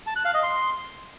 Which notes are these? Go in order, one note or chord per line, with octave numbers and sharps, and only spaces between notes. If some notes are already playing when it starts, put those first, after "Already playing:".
A5
F#6
F5
D#5
C6